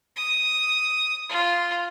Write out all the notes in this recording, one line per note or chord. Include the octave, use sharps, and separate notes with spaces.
D#6
F4